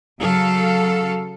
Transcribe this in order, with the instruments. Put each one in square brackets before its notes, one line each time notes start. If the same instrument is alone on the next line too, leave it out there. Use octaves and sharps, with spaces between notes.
[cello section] C#3 F#3 A4 F5